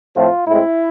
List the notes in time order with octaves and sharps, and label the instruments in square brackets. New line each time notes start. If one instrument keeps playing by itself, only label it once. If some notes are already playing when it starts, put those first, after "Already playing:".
[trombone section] A2 F3 A3 C4 F4
A2 G#3 C4 E4